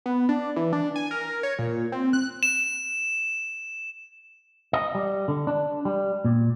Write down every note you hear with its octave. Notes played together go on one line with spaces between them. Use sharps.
B3
D4
E3
D4
G#5
A#4
C#5
A#2
C4
F#6
E7
D#5
G3
D3
D4
G3
A#2